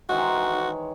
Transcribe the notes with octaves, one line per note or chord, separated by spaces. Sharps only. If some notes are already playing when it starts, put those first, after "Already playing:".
D#3 E3 G#3 F#4
C#5